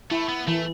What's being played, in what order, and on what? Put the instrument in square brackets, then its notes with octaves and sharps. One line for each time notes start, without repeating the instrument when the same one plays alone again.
[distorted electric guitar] A3 [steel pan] E4
[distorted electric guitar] B3
[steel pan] E3 [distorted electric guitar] A3